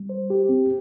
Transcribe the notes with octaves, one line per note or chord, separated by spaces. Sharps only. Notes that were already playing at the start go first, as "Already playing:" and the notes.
Already playing: G3
C5
G4
C4